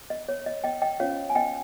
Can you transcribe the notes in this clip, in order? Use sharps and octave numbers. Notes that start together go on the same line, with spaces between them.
D#5
C#5
D#5
D#5 G5
D#5 G5
C#4 F4 C5 C#5 F5
G#5
D#5 G5